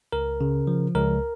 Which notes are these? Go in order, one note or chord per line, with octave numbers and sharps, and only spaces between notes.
C#2 A#4
C#3
F3
C#2 A#4